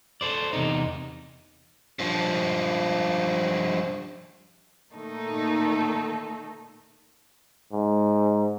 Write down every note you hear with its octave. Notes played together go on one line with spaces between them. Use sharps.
A4 C5 D5
E2 C3 D#4
G2 F3
A#2 D#3 A3 D#4 A4
G#2